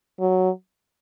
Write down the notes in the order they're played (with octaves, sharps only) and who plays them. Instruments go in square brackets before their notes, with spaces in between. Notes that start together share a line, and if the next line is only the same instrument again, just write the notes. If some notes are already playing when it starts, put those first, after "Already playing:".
[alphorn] F#3